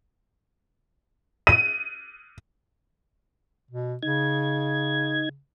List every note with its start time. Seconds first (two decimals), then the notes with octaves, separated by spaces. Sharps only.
1.47 D#7
3.71 B2
4.03 C#3 D#4 G#6